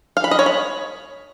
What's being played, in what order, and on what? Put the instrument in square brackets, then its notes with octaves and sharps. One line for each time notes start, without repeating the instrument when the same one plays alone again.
[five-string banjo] F5
B5
D#5
C#5
B5